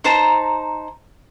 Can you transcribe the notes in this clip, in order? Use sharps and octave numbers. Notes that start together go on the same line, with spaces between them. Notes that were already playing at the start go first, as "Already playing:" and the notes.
D#4 C5 A5 A#5